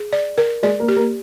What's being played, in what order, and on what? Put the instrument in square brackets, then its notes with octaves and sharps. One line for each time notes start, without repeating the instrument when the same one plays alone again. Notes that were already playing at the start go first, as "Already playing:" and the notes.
Already playing: [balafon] G#4
D5
A#4
[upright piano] G#3 G#4 [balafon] D5
[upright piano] A#3 A#4
[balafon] G4
[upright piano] A#3 A#4